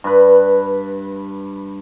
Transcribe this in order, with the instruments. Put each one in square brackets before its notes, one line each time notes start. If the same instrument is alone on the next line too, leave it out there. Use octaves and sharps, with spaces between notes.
[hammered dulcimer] G2 B4